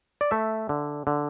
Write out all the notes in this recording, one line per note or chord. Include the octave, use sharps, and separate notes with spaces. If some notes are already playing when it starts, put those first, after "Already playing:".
D5
A3 E5
D3
D3